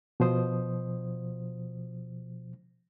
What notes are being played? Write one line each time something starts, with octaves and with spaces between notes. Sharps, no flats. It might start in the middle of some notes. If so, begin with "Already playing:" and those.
B2 F3 C5 D#6